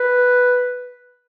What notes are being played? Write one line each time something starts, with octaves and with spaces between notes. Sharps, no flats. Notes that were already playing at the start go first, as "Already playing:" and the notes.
Already playing: B4